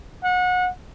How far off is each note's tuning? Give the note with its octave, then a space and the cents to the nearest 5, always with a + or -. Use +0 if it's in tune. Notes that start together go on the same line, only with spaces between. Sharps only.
F#5 -30